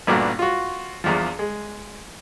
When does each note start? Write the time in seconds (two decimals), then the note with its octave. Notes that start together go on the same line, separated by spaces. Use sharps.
0.07 A1 G2 A#2 B3 D4 F#4
0.39 F4 F#4
1.04 A#1 E2 F3
1.39 G#3